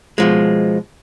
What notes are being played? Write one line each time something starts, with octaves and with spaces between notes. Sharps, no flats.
B2 F3 G#3